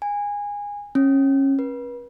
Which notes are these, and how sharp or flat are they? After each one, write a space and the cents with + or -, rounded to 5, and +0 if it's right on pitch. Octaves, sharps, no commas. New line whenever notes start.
G#5 -20
C#4 -25
B4 -35